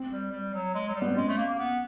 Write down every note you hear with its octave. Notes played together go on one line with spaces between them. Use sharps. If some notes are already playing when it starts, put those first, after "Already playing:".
Already playing: C4
G3
G3
F#3
G#3
F#3
G3
B3
C4
G#3 C#4
A3
A#3
A#3
B3